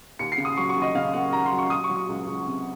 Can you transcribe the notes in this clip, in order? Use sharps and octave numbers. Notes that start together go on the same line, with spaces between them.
D#2 C#7
C7
C#3
D#6
F#3 C#6
C#6
D#2
D#5
C#3 F5
A#3 F#5
D#2 A#5
C6
F#3
C#6
F#3 D#6
C#6
F#3
D#6
C#2
C#2
C3